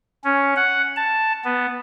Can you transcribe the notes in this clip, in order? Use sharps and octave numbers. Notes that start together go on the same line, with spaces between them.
C#4
F#5
A5
B3